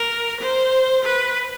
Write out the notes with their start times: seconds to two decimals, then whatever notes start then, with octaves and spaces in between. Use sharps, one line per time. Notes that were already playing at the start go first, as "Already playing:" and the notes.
Already playing: A#4
0.40 C5
1.05 B4